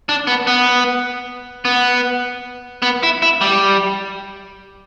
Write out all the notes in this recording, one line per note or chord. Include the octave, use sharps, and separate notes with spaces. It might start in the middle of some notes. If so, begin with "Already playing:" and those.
D4
B3
B3
B3
B3
E4
E4
G3